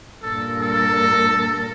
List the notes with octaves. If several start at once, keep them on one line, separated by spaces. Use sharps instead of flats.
G2 A#2 A4 A#4
A4